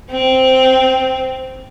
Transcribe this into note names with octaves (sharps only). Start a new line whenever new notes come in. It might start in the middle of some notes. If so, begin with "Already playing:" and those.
C4